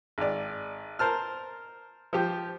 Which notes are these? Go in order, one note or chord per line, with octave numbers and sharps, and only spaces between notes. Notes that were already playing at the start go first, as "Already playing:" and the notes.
G#1 D5
A#4 C5 A5 F6
F3 G4